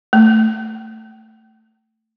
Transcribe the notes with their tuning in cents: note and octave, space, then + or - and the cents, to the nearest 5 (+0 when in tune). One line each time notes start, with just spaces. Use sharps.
A3 +15